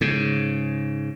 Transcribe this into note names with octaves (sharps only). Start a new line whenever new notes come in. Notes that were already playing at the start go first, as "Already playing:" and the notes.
G#2 C#3